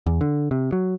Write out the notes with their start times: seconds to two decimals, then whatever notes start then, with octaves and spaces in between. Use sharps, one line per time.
0.06 E2
0.21 D3
0.51 C3
0.72 F#3